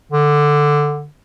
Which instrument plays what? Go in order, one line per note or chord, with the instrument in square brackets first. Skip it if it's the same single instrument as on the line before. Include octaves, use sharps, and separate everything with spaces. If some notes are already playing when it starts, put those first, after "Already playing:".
[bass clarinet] D3